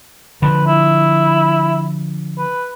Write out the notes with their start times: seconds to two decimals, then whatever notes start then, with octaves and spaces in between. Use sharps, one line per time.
0.42 D3 F3 B4
0.66 E4
2.38 B4